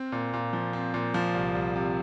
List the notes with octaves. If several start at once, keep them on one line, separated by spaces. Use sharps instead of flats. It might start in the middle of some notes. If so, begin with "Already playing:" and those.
Already playing: C4
A#2
A#2
F3
C4
A#2
F3
C2
C2
C3